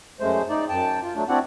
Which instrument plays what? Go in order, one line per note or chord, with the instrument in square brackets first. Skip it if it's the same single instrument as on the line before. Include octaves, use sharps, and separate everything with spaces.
[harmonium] F#2 G#3 A3 C5
D#4 D5
F#2 G5 A5
F4
F#3 A3 D4
C4 D4 E4 F#4 D5 F#5